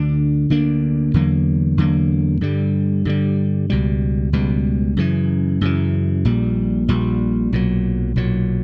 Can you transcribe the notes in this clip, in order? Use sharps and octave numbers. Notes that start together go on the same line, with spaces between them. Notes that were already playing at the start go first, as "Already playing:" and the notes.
Already playing: D2 D3 D4
D2 D3 A#3 D4
E2 D3 F#3 A#3
E2 D3 F#3 A#3
G2 D3 G3
G2 D3 G3
C#2 B2 G3
C#2 B2 G3
F#2 C#3 E3
F#2 C#3 E3
A#1 A#2 G3
A#1 A#2 G3
B1 A#2 F#3
B1 A#2 F#3